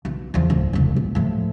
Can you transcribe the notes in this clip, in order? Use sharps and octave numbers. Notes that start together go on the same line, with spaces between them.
B1
E2 F3
D1 G1
E1 C2
A#1
A2 F3